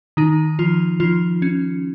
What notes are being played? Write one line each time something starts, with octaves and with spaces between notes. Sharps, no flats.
D#3 D#4
F3 F4
F3 F4
C#4